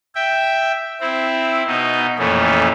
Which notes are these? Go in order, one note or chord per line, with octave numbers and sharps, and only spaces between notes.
E5 G5
C4 E4
B2 D#4
F2 A#2 E3 A3 C#4